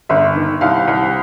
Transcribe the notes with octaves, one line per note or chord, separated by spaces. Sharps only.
G1 E5
D#3
C2 F5
C2